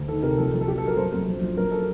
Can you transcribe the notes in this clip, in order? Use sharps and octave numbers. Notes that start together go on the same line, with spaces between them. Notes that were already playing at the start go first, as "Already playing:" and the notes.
Already playing: D2
D#3 A4
C3 A#4
A#1 A4
A#1
A4
F#3 G4
A4
F#3
A#4
F#2 C5
F#2
A#1
A#1
F#2 A#4
A4